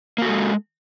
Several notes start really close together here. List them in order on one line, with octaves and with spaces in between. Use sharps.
A#3 F#4 A4 G#3